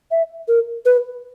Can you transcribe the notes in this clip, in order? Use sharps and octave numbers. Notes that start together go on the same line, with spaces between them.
E5
A#4
B4